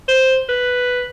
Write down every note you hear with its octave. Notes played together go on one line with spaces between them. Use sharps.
C5
B4